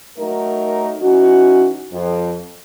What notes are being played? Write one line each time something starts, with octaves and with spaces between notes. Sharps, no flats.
F#3 A3 D#4 A#4
E3 C#4 D#4 F#4
F2